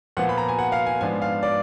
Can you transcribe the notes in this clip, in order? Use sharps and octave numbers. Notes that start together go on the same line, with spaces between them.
A#2 F3 B3 F#5
B5
A#5
G#5
F#5
F5
G#5
G#2 F3 B3 D4 G#5
F5
D5